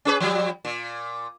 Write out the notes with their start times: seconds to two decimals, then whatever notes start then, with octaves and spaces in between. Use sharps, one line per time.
0.05 C#4 G#4 B4
0.20 F3 G3
0.65 A#2